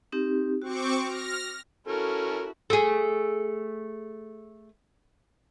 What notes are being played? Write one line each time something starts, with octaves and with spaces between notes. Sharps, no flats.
C4 D#4 G4
C4 F#4 C#6 D6
F6 A#6
C#4 E4 F#4 A4 A#4
A3 G#4